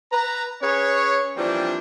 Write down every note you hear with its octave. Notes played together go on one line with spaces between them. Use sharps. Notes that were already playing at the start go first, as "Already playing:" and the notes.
B4 A#5
C#4 G#4 B4 C#5
E3 F3 G3 A#3 C4 D4